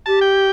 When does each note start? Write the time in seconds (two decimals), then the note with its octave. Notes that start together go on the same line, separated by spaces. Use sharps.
0.06 G4 A5
0.21 G5